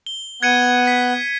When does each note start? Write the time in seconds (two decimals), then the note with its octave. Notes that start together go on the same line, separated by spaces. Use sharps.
0.06 G7
0.43 B3 F#6 G#6 C#7 D#7
0.87 B6